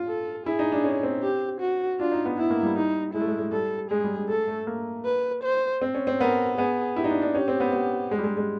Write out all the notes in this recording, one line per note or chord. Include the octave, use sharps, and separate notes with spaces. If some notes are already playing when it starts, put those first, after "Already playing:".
Already playing: F4
A4
E4 G#4
D#4
D4
C#4
C4
G4
F#4
D4 F4
D#4
B3
B3 E4
A#3
G3
D#4
G#3 E4
A3
G#3
G#3
G3 A4
G#3 G#4
G3
G#3
A3 A4
A3
A#3
B4
C5
C4
C#4
C4
B3 A#4
B3 G#4
E4 G4
D#4
D4
D4
C#4 G4
C4
B3
B3
G#3
G3
G#3
G#3